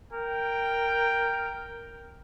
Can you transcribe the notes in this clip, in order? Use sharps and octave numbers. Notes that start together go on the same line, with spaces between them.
A#4 G5